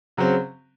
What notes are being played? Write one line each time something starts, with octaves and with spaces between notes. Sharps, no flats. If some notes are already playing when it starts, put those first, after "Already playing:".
C#3 F#3 C4